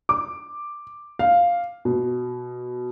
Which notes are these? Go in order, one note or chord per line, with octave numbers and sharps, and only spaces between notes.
D6
F5
B2